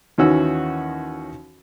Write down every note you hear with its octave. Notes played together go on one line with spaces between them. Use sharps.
D#2 D#3 E3 C#4 F#4 E6